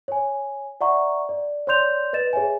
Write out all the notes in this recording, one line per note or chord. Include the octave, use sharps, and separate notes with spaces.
C#5 G#5
D5 E5 F#5 A#5 C#6
D5
C#5 D5 C6 G6 F7
B4 D#5 A6 E7
G#4 C#5 E5 G#5